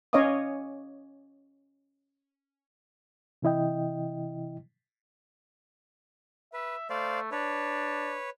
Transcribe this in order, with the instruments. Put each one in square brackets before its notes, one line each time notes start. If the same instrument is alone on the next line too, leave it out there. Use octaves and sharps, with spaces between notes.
[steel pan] C#4 C#5 D#5 F5 D6 D#6
[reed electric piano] C3 E3 E4 D#5 G5
[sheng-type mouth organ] B4 [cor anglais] E5
[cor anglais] A3 [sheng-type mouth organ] C5 D5 F5
[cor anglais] D4 [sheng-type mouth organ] B4 C#5